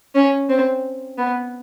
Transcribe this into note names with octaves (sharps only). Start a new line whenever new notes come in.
C#4
C4
B3